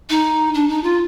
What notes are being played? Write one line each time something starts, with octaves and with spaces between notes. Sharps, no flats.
D#4
D4
D#4
F4